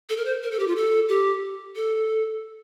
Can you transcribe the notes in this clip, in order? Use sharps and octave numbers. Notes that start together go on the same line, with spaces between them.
A4
A#4
C5
A#4
A4
G4
F4
A4
G4
A4